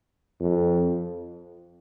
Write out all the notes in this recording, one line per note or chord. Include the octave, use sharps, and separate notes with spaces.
F2